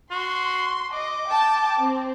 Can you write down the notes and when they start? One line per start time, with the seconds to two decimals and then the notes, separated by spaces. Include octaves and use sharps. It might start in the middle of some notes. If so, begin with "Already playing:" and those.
0.11 F#4 C6
0.92 D#5 D6
1.27 G5 A5
1.79 C4